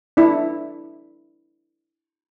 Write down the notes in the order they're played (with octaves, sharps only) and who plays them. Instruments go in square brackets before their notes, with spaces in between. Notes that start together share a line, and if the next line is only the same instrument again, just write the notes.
[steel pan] D4 E4